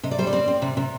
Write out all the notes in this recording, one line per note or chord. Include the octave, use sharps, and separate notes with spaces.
C3 D#5
D5
G3 C5
D5
C4
C4
C3
C3